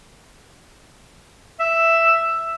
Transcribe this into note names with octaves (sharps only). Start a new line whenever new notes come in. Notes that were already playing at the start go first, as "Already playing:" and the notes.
E5